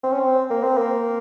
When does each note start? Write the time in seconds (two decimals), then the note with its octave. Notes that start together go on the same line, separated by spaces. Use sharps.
0.03 C4
0.12 C#4
0.20 C4
0.50 A#3
0.63 C4
0.77 A#3